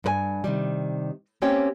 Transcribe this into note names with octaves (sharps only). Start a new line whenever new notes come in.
G2 B4 G#5
C3 D#3 G3
A#3 C4 C#4 G4 C#5 G5